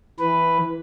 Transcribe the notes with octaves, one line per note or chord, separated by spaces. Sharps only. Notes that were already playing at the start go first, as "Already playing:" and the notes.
E3 B4